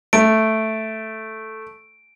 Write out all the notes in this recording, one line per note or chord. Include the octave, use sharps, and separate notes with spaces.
A3 D7